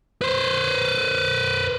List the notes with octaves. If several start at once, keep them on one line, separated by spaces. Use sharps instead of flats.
B4 C5